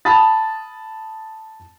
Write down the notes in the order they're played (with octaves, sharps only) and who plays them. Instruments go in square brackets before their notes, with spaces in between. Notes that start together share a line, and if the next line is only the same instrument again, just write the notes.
[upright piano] A5 B5 D#6 A6